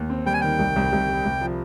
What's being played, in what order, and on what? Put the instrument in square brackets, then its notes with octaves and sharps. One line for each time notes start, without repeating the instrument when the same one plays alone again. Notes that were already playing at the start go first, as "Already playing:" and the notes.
Already playing: [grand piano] D#2
C4
[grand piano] G3 [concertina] G5
[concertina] G#5
[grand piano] D#3 [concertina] G5
[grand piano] C2
C2
C2
G3
C2
F3